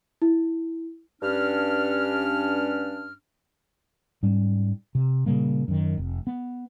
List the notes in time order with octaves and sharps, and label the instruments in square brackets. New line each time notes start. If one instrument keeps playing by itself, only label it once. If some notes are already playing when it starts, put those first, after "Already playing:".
[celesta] E4
[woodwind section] G2 C#4 D4 F6
[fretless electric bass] G#2 G3 C#4
C3
A#2 C#3 G3 A#3
F#2 D#3
F1
B3